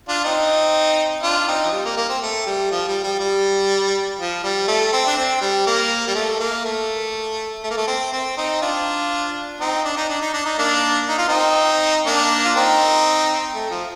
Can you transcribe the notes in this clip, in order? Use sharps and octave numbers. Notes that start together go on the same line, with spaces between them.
D4 F4
C4 D#4
D4 F4
C4 D#4
F3
G3
A#3
A#3
C4
A3
G3
F3
G3
G3
G3
F3
G3
A3
C4
D4
C4
G3
A#3
G3
A3
A#3
A3
A3
A#3
A3
C4
C4
C4 D#4
D4 F4
C4 D#4
D4
D#4
D4
D#4
D4
D#4
A#3 D4
D#4
F4
C4 D#4
A#3 D4
F4
C4 D#4
A3
F3